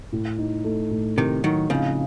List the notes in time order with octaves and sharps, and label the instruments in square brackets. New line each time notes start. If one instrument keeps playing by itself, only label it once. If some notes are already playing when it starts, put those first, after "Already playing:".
[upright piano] A2
D#4
A3
A2
[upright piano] A2 [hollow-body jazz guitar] C3 D#3
[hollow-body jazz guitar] D#3 F#3 [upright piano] D#4
[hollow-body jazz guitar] C#3 F3 [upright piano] C4